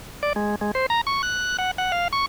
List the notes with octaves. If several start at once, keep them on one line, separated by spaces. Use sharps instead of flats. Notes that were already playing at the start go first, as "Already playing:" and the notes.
D5
G#3
G#3
C5
A#5
C#6
F#6
F#5
F#5
F5
C#6